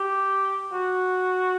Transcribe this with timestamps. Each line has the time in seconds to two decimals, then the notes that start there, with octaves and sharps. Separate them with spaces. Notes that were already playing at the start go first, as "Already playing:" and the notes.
Already playing: G4
0.73 F#4